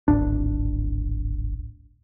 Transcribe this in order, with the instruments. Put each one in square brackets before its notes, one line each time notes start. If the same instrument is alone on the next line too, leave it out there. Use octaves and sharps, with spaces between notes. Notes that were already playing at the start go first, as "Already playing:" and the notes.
[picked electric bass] D1 G#1 D4